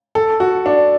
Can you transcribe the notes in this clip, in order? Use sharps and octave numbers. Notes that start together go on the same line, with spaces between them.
A4
F#4
D4